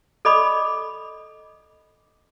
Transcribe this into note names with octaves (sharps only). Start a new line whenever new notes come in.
A4 D5 D#5 B5 D6